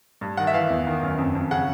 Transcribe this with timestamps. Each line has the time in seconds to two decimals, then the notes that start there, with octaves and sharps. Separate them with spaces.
0.21 G2
0.37 D#3 F#5
0.47 E5
0.54 E3 F5
0.70 E2
0.87 D#3
1.03 F#2
1.18 F2
1.35 F2
1.51 C#3 F#5